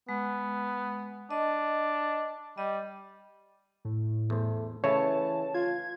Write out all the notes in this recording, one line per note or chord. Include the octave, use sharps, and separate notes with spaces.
G#3 B3
D4 D#5
G3 D#5
A2
E2 A3 C5
C#3 E3 A3 E4 C#5 A5
F4 G#6